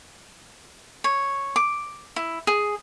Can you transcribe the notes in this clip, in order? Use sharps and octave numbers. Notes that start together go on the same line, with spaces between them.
C#5
D6
E4
G#4